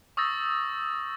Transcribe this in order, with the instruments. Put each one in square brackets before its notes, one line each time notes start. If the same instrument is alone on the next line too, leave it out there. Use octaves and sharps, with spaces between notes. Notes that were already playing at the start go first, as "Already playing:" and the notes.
[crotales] C#6 D#6 E6 G6 A6 A#6